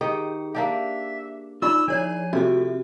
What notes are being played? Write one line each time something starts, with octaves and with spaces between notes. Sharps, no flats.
D#3 G4 G#4 D#5
A#3 D4 G4 E5
D#4 F4 D5 B5 C#6 D6 E6
F3 E4 G#4 C#5 D5 G#5 G6
C3 A3 C4 F4 F#4 A4 E5